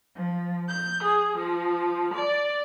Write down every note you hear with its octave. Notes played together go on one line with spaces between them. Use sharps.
F3
G6
G#4
F3
D5